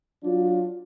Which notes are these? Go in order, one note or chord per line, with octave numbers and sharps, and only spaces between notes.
F#3 D4 F4